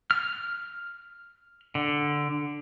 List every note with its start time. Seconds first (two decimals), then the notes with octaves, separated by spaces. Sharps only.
0.11 F6
1.75 D3